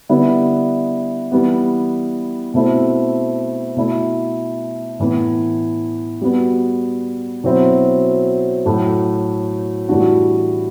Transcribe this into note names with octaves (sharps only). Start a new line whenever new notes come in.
D3 G3 B3 E4
E3 G3 B3
B2 A3 C4 E4 A4
B2 A3 E4
A2 E3 B3
G3 B3 F#4
B2 F#3 C4 E4
A2 F#3 A3
A2 E3 G3 D4 F#4